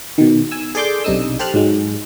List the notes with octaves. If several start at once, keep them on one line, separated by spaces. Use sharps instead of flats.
B2 D#3
G#5 E6
G#4 A4 D5 C6 D6 G6
B1 C3 D4 D#4 D#6 E6
G4 A4 C5 A5 F6 F#6
G#2 F#3 G#3